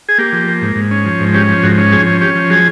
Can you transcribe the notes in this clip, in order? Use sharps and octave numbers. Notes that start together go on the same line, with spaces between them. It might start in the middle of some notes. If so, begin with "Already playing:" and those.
G#4
A#3 G4
F3
A#3
G#2
G#2
C#4
F3
G#2
C#4 G4
F3
G#2 F#4
C#4
F3 G#4
C#4
C#4 G4
F3
F#3 G#4